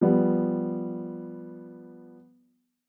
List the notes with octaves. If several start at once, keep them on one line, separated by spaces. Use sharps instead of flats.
F3 G3 B3